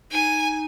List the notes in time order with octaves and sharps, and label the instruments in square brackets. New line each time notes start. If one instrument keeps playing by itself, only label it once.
[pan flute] D#4 [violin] G#5